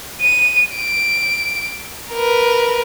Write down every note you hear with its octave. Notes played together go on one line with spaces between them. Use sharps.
D#7
D7
A#4 B4